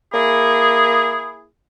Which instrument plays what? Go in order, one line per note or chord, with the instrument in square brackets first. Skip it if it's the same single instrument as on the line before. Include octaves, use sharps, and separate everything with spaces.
[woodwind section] A#3 E4 G#4